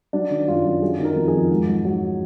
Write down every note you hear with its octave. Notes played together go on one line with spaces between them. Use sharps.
F#3 D4
D#3
F#2 F4
F#2
F#3 G#4
D#3
A#4
F2
G#4
F2
G#2
F#3
F#3